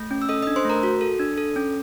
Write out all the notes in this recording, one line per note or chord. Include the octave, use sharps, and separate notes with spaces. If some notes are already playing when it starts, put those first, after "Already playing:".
Already playing: A3
C#4
E6
A4 D#5 D#6
D4 D#5 D#6
C5 C6
A3 A#4 A#5
F#4
A4
D4
A4
C#4